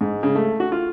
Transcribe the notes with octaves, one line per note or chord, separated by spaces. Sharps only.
G#2
C#3
A3
F#4
F4